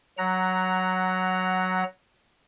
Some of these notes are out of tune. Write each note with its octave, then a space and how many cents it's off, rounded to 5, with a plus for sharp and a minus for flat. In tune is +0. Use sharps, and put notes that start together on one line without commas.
F#3 +0 F#5 +10 A#5 +0